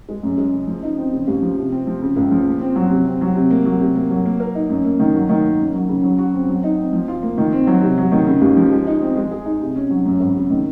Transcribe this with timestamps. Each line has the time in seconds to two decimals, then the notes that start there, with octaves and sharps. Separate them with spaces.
0.09 G#3
0.23 F#2
0.38 G#3
0.54 C#3
0.67 F3
0.83 D#4
0.98 C4
1.13 C#3
1.27 D#2
1.42 F3
1.57 C3
1.72 C4
1.87 F3
2.02 C#3
2.16 C#2
2.31 F3
2.47 A#2
2.61 C4
2.76 F#3
2.91 C3
3.06 C4
3.21 F#3
3.36 C3
3.51 A#3
3.65 F#3
3.80 C3
3.95 A#3
4.11 F#3
4.25 A#3
4.40 A#4
4.55 D#4
4.70 F#2
4.84 A#3
4.99 D#3
5.14 F#3
5.29 D#3
5.44 A#3
5.59 F#2
5.74 F#3
5.89 C#3
6.04 F#3
6.18 F#4
6.34 C4
6.48 F#3
6.64 D#4
6.78 C4
6.93 F3
7.08 F4
7.23 A#3
7.38 D#3
7.52 C4
7.67 F#3
7.82 C3
7.98 F#3
8.12 D#3
8.27 C#3
8.41 D#2
8.57 F3
8.71 G#3
8.87 D#4
9.02 C4
9.16 G#3
9.31 G#4
9.45 D#4
9.61 C3
9.76 C#4
9.90 F#3
10.05 F#2
10.20 G#1
10.35 C#3
10.50 D#3